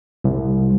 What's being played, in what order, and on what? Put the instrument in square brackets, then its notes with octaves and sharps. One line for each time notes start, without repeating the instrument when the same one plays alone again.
[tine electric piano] C2